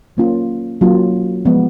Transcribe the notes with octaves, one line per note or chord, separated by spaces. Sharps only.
F#3 A#3 C#4 F4
F#3 A#3 C#4 F4
F3 G#3 B3